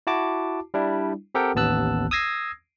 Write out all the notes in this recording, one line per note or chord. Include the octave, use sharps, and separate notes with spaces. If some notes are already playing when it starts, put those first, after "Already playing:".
E4 F#4 A5 D6
G3 D4 E4
C4 G4 A4 A#4 F#5 G5
A1 D#2 B3 A5 E6 F#6
D#6 E6 G#6 A#6 C7